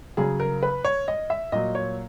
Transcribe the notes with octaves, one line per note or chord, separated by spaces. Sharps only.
C#3 F#3 G#4
A#4
B4
C#5
D#5
E5
A#2 F#3 D#5
C#5